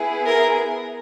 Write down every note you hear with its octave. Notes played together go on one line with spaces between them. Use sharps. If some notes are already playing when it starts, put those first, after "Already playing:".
Already playing: B3 E4 G#4
A#4